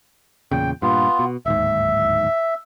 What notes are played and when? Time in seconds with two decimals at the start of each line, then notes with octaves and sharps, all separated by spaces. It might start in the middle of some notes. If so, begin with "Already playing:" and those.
0.51 E2 A#2 C#3 G5
0.82 G2 A#2 B3 F4
1.19 B2
1.46 D1 D#2 G#2 E5